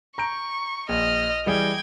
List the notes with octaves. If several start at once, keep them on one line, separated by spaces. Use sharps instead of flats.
A#5 C#6 G6 D7
A#1 D#5 F6
E3 G3 G#4 G5 G#6